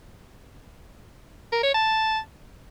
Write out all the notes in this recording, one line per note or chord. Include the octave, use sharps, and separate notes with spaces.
A#4
C#5
A5